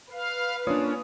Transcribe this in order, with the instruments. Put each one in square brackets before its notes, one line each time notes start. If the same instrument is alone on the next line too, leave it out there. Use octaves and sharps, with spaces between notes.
[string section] B4 [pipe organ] F5
[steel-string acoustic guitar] A#3 D4 [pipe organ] C#4 [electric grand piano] F4 C#5 D#6